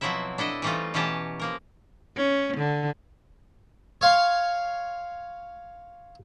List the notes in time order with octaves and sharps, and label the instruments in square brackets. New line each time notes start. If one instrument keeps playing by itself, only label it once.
[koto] B2 F3 F#3 C4 E4 E5
D4 E4 A4 D#5
E3 G3 A3 C4 D#4 F4
B2 E3 C#4 G4 A5 A#5
F3 A#3 A#4
[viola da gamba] C#4
D3
[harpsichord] C#5 F5 C6